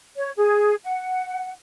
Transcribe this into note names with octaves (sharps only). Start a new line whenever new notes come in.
C#5
G#4
F#5